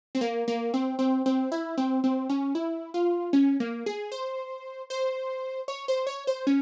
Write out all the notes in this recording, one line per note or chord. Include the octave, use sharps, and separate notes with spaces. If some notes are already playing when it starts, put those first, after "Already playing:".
C4
A#3
A#3
C4
C4
C4
E4
C4
C4
C#4
E4
F4
C#4
A#3
G#4
C5
C5
C#5
C5
C#5
C5
C#4